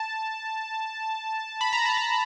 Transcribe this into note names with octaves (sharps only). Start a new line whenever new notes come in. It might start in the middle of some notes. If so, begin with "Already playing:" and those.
Already playing: A5
B5
A#5
A5
A#5